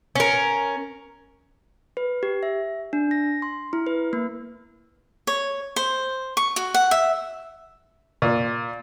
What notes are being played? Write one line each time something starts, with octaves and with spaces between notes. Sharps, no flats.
C#4 A#4
B4
G4
E5
D4
A#6
C6
E4
B4
A#3
C#5
C5
C#6
F#4
F#5
E5
A#2